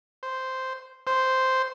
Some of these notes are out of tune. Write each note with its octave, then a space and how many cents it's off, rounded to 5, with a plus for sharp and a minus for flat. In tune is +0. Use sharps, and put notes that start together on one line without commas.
C5 -5
C5 -5